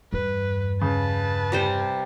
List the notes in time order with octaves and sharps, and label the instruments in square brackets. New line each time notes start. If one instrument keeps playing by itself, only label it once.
[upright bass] E2 G2 [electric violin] B4
[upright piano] C#3 [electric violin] B4 A5
[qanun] C3 G3 C5